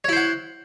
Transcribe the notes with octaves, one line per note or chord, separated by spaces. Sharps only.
E4 C5 C#5 F#5